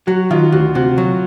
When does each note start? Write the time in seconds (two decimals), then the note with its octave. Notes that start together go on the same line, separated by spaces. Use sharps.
0.07 F#3 F#4
0.31 D#3 F4
0.52 D2 F#4
0.75 C3 F#4
0.98 F#3